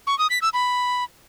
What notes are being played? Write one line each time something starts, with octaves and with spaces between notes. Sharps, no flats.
C#6
D#6
B6
E6
B5